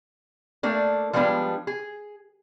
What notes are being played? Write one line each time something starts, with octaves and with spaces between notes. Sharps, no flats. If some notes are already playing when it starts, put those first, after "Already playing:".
A3 A#3 D4
F3 G3 G#3 B3 D4
G#4